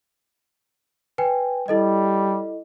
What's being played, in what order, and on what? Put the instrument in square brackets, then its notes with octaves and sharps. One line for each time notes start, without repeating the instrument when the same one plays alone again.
[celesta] B4 G5 G#5
[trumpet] G3 [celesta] E4 A4 D#5